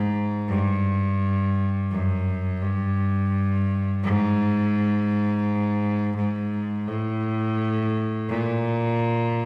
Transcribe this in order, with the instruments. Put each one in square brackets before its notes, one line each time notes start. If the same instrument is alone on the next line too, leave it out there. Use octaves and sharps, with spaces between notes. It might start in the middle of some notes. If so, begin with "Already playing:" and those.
Already playing: [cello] G#2
G2
F#2
G2
G#2
G#2
A2
A#2